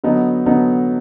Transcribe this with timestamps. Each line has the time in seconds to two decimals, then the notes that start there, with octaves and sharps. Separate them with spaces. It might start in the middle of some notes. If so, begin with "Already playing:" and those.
0.04 D3 F#3 B3 D#4
0.46 D3 F#3 B3 D#4